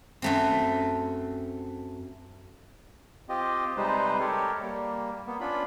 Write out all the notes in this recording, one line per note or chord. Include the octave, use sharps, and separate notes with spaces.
F#2 A3 C4
C4 F4 G4 D#5
C3 G3 G#3 D#4 B4 C5
G4 A4 A#4 C#5
G3 A#3
A#3 B3
C#4 D4 F4 B5